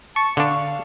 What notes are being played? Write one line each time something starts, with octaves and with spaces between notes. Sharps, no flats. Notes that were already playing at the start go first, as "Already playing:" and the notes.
A5 C#6
D3 D4 F5